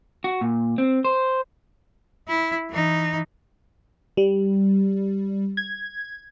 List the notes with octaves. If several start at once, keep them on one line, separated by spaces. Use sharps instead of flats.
F#4
A#2
C4
C5
E4
E3 D#4
G3
G#6